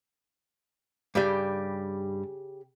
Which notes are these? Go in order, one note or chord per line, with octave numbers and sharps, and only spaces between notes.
G2 C#3 G3 G4 G5